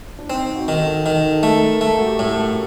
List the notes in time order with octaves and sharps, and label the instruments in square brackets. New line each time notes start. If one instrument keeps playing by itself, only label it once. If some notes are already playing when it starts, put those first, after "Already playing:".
[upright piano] D4
[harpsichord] C4 [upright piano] D#4
[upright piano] D#4
F#4
[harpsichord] D#3
[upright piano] A4
[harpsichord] D#3 [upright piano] A#4
[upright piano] A4
[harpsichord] A3 [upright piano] A4
[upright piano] A#4
[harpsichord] A3 [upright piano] A4
[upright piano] F#4
G4
[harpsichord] A2 [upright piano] A#4
[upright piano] A4
F#4